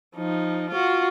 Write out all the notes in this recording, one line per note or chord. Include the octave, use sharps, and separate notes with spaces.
F3 D#4
F4 F#4